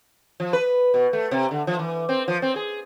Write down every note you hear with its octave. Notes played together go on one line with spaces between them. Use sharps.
F3
B4
B2
A3
C3
D3
F3
E3
C4
F3
C4
G#4